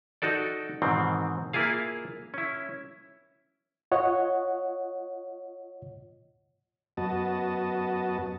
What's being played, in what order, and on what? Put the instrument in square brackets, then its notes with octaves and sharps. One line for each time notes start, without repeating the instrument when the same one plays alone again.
[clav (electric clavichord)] D#4 F#4 A4 D5
G#2 B2 D#3 E3 C4
A#3 E4 F4 G#4 F5
C#4 E4
[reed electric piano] F4 C#5 D#5 F#5
[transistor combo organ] F#2 B3 F#4 D#5 A5